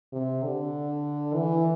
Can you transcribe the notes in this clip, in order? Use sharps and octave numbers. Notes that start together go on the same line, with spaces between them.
C3
D3
E3